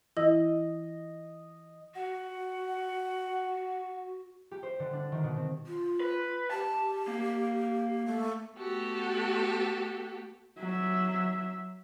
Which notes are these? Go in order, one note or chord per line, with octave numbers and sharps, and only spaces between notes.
E3 E4 D#5 A#6
F#4 F#5
G4
C5
D3
D4
D#3
B2
C4
F4
B4
G4 A5
A#3
A3
A3 B3 F#4 G4 A4
F#3 E5